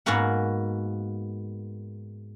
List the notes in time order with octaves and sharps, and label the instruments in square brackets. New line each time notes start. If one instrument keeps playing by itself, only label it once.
[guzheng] G#2 A#3 B3 F#4 A#4 F#5